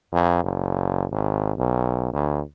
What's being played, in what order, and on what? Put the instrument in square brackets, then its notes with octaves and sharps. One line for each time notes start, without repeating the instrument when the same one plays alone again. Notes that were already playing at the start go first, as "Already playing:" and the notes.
[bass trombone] F2
F#1
G#1
B1
D2